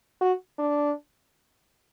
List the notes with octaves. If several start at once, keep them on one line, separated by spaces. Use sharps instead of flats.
F#4
D4